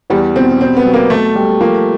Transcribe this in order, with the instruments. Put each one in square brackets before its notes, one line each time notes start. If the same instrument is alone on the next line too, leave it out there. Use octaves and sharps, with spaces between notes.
[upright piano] E2 [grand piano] G3
[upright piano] B2 [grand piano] C4
[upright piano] B2 [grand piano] C4
[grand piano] B3
[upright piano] F#3
[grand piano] A#3
[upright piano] B2 [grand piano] A3
[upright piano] G3
[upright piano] F3 [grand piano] A#3